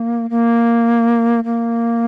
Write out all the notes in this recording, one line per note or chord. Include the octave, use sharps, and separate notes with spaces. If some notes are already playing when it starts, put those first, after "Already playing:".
Already playing: A#3
A#3
A#3